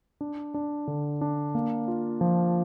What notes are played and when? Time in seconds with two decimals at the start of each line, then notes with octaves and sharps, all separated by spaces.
0.21 D4
0.54 D4
0.87 D3
1.21 D4
1.55 A#3
1.88 F4
2.21 F3